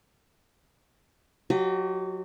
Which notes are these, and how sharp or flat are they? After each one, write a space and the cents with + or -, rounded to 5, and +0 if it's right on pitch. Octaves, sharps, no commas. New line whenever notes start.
F#3 -20 G4 -40 D#5 +0